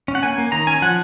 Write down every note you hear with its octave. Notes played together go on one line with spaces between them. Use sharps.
C#4
F#5
A#3 G#5
A#3
D#3 A#5
C#4 G#5
F3 F#5